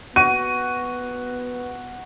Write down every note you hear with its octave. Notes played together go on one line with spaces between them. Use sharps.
B3 F#4 D#7